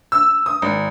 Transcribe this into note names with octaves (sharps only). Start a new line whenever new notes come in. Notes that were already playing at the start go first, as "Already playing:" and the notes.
E6
D#6
G#1